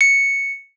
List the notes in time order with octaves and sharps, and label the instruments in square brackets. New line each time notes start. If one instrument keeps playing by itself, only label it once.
[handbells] C#7